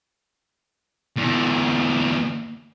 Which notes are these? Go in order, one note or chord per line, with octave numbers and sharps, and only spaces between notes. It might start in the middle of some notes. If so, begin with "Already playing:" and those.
E2 D3